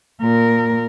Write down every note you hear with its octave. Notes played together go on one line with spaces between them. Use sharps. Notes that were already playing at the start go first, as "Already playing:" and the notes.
A#2 A#4